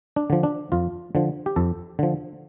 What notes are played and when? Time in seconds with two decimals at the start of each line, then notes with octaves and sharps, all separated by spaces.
0.16 D4
0.30 D3 F3
0.43 D4
0.72 F2 F4
1.15 D3 F3
1.46 G4
1.56 F2 A4
1.99 D3 F3